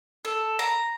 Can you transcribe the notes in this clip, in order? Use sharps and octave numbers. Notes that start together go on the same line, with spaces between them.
A4
A#5